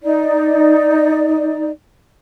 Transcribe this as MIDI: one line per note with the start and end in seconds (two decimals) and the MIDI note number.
0.03 1.68 63
0.03 1.68 74